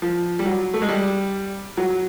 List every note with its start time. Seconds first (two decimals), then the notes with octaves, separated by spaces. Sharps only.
0.02 F3
0.39 G3
0.46 F#3
0.74 A3
0.82 G#3
0.89 G3
1.77 F#3